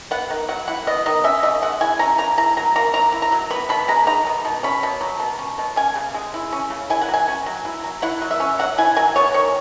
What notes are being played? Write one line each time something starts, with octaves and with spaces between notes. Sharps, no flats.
B3 F#5
D#3
F#3 F#5
E4 F#5
B3 D#5
D#3 D#5
C#4 E5
C#3 D#5
G#3 F#5
E4 G#5
C#4 A#5
C#3 A#5
E4 A#5
F#3 A#5
A#3 A#5
F#3 A#5
E4
A#5
F#3
B3 B5
B2 B5
G#3 A#5
D#4 A#5
B3
B2
C#4 B5
B2
F#3
B2
C#4
B2
C#4 G#5
C#3
G#3
E4
C#4
C#3
E4 G#5
F#5
F#3
G#5
C#4
F#3
E4
F#3
E4 F#5
F#3
E5
C#4
F#3 F#5
E4 G#5
F#3 G#5
B3 C#5
D#3 C#5